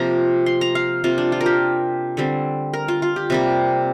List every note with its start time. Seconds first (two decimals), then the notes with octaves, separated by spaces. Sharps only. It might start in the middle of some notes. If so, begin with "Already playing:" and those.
Already playing: C3 F3 A#3 A#5
0.46 C6
0.61 A#5
0.75 F5
1.04 C3 A#3 F4
1.18 D4
1.32 F4
1.41 A#4
1.46 G4
2.17 D3 G3 C4
2.73 A#4
2.88 F4
3.02 F4
3.16 G4
3.30 C3 G3 A#3